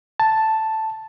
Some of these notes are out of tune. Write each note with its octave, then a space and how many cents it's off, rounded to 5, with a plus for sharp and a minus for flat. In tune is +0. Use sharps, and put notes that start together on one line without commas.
A5 +0